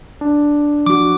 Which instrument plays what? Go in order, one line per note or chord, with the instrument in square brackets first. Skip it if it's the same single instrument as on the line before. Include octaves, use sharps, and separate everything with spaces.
[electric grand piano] D4
[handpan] F3 F#4 [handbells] D6